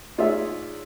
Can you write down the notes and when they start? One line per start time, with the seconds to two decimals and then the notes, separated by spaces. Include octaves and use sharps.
0.18 D#4 F4 G#4 C#5 D5 E5